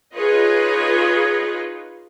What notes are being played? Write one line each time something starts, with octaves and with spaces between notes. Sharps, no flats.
D#4 F4 G#4 B4 C#5 D#5